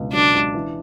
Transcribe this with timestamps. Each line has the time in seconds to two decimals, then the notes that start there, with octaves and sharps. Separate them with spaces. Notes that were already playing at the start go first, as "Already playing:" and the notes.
Already playing: C#2 B2 D3
0.13 F#3 D4
0.34 C#2
0.54 E3